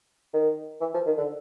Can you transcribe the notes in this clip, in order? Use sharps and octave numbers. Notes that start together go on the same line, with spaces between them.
D#3
E3
F3
D#3
D3